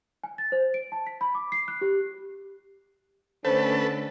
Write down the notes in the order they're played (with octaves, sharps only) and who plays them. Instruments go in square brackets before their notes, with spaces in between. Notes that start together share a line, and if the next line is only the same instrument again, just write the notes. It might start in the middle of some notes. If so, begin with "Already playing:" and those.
[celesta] G#5
A6
C5
D7
A5
B6
B5
D6
C7
F#6
G4
[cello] D3 A3 [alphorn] C#4 [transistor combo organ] A4 B4 [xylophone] C5